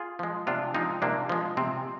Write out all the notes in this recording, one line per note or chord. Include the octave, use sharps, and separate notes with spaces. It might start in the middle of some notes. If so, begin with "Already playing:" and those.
Already playing: F4 G#4
F3 G#3
C3 D4 F4
F3 G#3 C4 D#4
C3 A#3 D4
F3 G#3
C3 C4